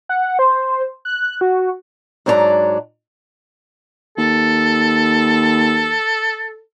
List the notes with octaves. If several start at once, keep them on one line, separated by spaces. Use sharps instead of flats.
F#5
C5
F#6
F#4
G#2 F#3 D4 C5 D5 A#5
D#2 A4